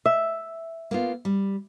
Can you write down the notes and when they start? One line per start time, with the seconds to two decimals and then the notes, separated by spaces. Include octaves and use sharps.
0.06 E5
0.91 A#3 B3 F4
1.25 G3